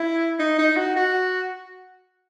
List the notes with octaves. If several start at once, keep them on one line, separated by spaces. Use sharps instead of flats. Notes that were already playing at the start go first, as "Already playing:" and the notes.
Already playing: E4
D#4
D#4
F#4
F#4